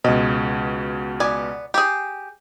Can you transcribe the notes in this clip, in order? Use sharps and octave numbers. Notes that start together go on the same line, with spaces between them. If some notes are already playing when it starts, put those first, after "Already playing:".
C#2 B2 D#5
B3 D5 G#5
G4 G#4